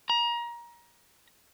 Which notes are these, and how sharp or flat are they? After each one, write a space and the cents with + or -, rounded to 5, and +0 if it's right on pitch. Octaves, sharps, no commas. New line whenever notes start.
A#5 +25